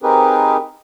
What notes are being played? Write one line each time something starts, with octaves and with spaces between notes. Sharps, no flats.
C4 D#4 G4 G#4 A#4 B4